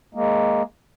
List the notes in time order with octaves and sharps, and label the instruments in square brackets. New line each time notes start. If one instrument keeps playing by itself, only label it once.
[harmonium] G#3 A#3